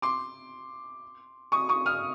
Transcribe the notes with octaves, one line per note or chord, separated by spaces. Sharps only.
C6 D6
C#6 D#6
C#6 D#6
D#6 F6